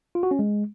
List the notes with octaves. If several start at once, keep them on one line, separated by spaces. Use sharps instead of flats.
F4
F#4
C#4
G#3